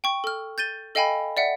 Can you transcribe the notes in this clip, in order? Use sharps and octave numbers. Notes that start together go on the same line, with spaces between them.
G5 C#6
A4 F6
G6 A6 D#7 G7
A4 D#5 F5 G5 G#5 B5
D5 E5 F#5